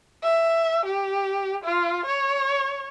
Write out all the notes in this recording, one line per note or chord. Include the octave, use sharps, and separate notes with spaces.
E5
G4
F4
C#5